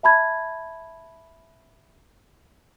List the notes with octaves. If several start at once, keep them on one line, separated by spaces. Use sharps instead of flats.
E5 A5 B5 G#6